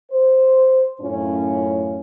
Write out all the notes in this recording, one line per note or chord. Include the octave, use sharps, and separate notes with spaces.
C5
F#2 A2 C#4 F4